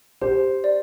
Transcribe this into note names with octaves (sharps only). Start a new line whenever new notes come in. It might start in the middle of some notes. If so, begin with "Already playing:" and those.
G4 C5
D5